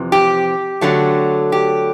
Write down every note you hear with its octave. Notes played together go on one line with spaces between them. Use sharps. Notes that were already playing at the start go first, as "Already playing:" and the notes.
Already playing: F2 C3 E3
G4
D3 F#3 A3
G4